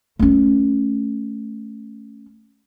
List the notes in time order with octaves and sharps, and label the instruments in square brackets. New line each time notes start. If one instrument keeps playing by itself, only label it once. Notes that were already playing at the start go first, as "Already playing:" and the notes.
[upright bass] A3 C#4